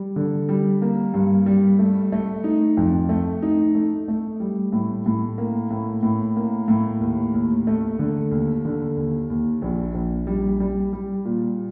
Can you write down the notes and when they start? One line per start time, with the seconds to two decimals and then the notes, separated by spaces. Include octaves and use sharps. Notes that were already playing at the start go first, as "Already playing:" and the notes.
Already playing: G3
0.16 D3
0.49 G3
0.82 A#3
1.14 G2
1.46 G3
1.79 A3
2.12 A3
2.44 D#4
2.77 F2
3.09 A3
3.42 D#4
3.75 A3
4.08 A3
4.40 G3
4.72 A2
5.06 A2
5.38 A#3
5.70 A2
6.03 A2
6.36 A#3
6.68 A2
7.01 D#2
7.34 D#2
7.67 A3
7.99 D3
8.31 D#2
8.65 D3
8.97 D#2
9.30 D#2
9.62 A#1
9.95 A#1
10.27 G3
10.60 G3
10.93 G3
11.25 A#2